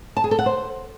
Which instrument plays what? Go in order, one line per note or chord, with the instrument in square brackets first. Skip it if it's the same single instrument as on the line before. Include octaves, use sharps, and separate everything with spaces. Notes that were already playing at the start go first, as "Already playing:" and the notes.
[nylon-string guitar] A5
G#4
A4
F#5
C5